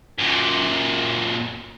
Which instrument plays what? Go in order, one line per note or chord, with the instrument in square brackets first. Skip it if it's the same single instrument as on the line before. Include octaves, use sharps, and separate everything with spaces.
[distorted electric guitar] F#2 A#2